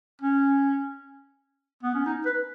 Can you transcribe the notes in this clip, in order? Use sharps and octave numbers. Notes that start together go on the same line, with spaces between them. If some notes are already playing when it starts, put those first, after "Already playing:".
C#4
B3
C#4
D#4
B4